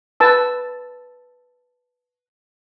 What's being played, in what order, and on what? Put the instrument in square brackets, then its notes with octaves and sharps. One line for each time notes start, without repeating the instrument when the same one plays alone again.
[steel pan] B4 A5 E6